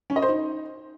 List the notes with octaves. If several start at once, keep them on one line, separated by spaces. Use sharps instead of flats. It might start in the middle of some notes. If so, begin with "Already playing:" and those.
C#4
D#5
C5
D#4